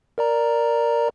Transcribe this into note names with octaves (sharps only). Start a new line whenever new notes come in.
A#4 D5 A#5